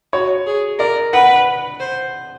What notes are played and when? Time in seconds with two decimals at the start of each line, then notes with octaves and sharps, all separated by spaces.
0.13 F#4 C#5
0.46 G#4
0.79 A#4 D5
1.13 B4 F#5
1.80 C5